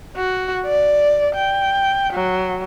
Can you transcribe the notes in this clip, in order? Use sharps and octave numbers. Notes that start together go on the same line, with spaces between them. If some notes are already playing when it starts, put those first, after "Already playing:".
F#4
D5
G5
F#3